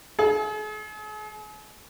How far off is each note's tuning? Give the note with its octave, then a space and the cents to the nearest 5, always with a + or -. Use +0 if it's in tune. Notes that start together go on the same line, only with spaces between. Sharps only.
G#4 +40